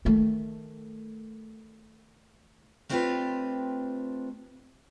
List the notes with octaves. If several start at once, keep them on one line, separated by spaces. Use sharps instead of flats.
D#3 A3
A3 C4 D4 F4 G4 B4